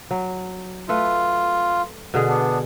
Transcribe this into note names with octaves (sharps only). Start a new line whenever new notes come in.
F#3
A3 F4 A4 B4
B2 D3 G#4
B3 D4